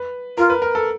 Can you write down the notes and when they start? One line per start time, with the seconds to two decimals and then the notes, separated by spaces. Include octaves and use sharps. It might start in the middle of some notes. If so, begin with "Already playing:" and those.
Already playing: B4
0.38 F4 A#4
0.50 B4
0.62 A#4
0.75 A4